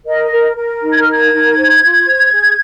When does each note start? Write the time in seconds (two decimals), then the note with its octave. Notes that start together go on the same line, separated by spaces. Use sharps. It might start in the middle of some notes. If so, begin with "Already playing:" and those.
0.06 A#4 D#5
0.31 A#4
0.56 A#4
0.82 D#4
0.92 G#6
1.01 F6
1.07 A#4 G#6
1.31 D#4
1.56 C5
1.82 F4
2.06 C5
2.31 G#4